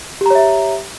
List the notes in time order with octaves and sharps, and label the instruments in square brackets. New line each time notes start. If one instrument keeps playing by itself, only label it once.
[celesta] G4
A#5
C#5
E5